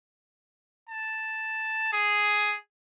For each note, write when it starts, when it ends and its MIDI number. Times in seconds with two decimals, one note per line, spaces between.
0.89 1.93 81
1.93 2.56 68